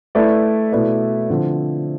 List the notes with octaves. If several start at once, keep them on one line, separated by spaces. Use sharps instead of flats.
A3 E4 B4 D5
B2 A3 E4 B4 D5
D3 F3 C4 E4